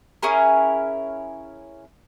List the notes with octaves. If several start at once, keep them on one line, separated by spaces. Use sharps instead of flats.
C#4 E4 G#4 A#4